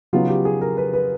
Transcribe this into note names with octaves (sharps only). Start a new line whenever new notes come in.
C#3 F#3 B3 D#4 F4
G4
G#4
A#4
B4
B4